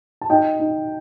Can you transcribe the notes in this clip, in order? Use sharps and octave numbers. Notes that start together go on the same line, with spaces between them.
A5
D#4 D#5 G5
D#4